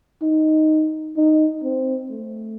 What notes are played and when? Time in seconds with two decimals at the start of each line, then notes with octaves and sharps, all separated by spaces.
0.22 D#4
1.17 D#4
1.63 C4
2.10 A3